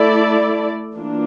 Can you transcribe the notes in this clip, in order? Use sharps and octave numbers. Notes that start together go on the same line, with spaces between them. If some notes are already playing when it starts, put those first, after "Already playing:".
Already playing: A3 E4 A4 D5
E3 A#3 D4 F4